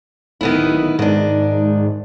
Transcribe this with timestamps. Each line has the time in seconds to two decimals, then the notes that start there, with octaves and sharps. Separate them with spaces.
0.41 D1 D#3 B3 E4
0.99 G#2 D#3 D4